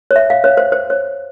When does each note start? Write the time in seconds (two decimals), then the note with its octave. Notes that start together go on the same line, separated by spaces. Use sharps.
0.11 C#5
0.16 E5
0.30 F5
0.44 C#5
0.57 C5
0.72 C5
0.90 C#5